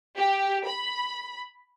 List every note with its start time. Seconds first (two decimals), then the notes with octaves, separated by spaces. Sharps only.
0.17 G4
0.66 B5